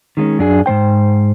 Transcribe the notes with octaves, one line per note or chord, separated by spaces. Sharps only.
D#3 G#3 A#3 C#4
F#2 D4 G#4
G#2 G3 C5 G5